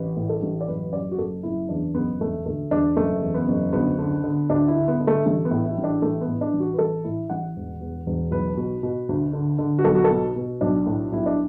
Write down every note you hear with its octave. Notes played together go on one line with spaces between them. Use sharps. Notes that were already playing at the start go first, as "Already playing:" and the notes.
Already playing: A1 B4
A2
A4
A1
D5
F#1 B4
F#2 D5
F#4
F#1 A4
F#1 E4
E2 D4
F#1 B3
E1 A3
D2 A3
E1 D4
F#1 A3
E2
B3
F#1
D2 B3
D3
D3
D2 D4
E4
D3
B3
D3
A3
A1 A3
B3
A2
E4
A1
D4
A1 A3
B3
A2
D4
A1
F#4
B4
A1 A4
A2 E4
A1 F#5
E1
E2
E1
B1 B4
B2
B2
D2
D3
D3
F#4
B1 A4
F#4
A4
B2
B2
B1 D4
A2
B1 E4
D4